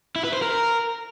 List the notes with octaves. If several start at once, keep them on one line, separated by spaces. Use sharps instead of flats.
E4
B4
C5
A#4